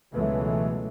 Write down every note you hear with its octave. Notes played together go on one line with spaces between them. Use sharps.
C#2 B2 E3 F#3 G#3 A3